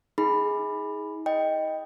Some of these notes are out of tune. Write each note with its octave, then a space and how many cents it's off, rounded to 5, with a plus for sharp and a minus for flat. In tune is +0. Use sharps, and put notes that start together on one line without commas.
D#4 +45 G#4 +0 B5 +0
D#5 +5 G5 +0